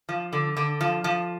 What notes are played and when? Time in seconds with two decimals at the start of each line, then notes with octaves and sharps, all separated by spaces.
0.09 F3
0.33 D3
0.57 D3
0.81 F3
1.04 F3